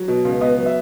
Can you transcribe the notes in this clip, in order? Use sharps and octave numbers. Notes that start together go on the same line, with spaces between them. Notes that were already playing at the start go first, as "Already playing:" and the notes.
Already playing: F#3
B2
C#2
B3 D#5
F#3
E5